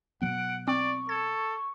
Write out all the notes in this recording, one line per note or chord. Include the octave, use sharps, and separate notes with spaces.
B2 F#3 B3 F#5 D7
C4 D5 C#6
A4 G#6